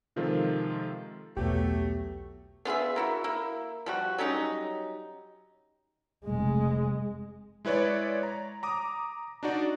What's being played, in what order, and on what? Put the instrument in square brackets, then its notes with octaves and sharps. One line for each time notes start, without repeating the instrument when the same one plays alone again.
[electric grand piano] C3 D#3 F3 G#3 F4 A4
[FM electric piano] B1 B3 [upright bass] E2 F4 [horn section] F#3 A3 [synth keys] G4
[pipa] B3 F4 G#4 E5
A#3 E4 F#4
A#3 E4
F3 G3 F#4
F#3 G3 C#4 D#4
[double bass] F1 G#3
[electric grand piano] G#3 E4 B4 C#5 D5
A#5
A#5 D6 D#6
D4 D#4 F#4 D5